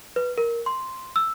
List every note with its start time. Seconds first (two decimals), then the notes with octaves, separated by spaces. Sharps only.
0.16 B4
0.38 A#4
0.66 C6
1.16 E6